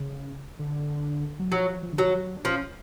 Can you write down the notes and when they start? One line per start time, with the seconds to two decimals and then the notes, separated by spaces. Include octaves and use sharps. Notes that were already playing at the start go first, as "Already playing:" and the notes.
Already playing: C#3
0.59 D3
1.39 F#3
1.52 F3 F#3
1.83 F3
1.92 D3
1.98 F3 F#3
2.13 F#3
2.37 D4
2.44 F3 C#4